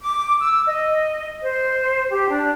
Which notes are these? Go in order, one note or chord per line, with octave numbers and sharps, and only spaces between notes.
D6
E6
D#5
C5
G4
D4